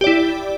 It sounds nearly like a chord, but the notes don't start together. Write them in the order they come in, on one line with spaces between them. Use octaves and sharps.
G4 D5 E4